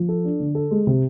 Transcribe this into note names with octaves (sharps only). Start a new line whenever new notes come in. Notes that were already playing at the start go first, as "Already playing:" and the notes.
Already playing: F3
A4
D4
D3
A4
G#3
C3